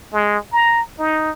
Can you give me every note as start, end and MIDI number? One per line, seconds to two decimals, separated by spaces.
0.13 0.38 56
0.52 0.81 82
0.99 1.31 63